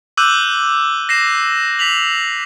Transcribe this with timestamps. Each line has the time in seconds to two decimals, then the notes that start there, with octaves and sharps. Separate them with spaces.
0.17 D6 E6 F#6 G6 D#7 F#7
1.09 A#6 C7 E7
1.79 B6 F7 F#7